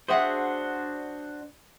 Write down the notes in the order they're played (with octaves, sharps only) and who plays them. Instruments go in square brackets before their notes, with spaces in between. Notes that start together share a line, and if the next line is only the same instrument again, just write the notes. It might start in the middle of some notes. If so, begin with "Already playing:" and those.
[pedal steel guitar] D4 F#4 C5 [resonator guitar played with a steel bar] G#4 E5 F#5